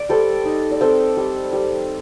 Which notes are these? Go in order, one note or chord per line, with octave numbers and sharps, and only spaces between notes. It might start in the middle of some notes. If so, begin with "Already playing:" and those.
Already playing: D5
G3 A4 C5
D#4
D5
C4 A4 C5
G3
G3